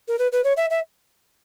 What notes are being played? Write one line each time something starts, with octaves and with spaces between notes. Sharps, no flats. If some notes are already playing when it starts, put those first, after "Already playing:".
A#4
B4
B4
C#5
E5
E5